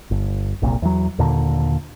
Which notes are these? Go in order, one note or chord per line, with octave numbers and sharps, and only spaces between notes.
G1
F#1 C2 A#2
E2 F#3
D#2 A#2 D3